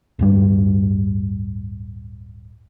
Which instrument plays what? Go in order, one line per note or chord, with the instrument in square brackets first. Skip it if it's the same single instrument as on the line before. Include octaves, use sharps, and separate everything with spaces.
[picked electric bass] D1 G2 G3